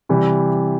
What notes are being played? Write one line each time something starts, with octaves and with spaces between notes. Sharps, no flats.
C3 E3 G3